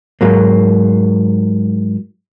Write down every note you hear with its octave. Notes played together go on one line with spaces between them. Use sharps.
G#2 F#3 A#3